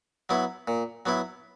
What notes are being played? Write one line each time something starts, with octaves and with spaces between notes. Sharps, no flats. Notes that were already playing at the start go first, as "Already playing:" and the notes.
F#3 B3 E4
A#2
F#3 B3 E4